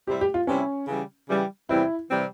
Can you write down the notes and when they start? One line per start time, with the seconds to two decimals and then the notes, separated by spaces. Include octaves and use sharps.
0.07 C3 G3 C4 E4 G4
0.21 G4
0.34 F4
0.47 C3 G3 C4 C#4 E4
0.87 C#3 E3 G3
1.29 C#3 E3 G3
1.69 E2 C3 E3 G3 C4 E4
2.09 C3 E3 G3 C4